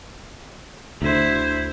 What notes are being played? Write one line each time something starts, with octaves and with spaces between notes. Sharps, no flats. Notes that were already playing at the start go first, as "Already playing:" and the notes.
D2 D3 E4 C5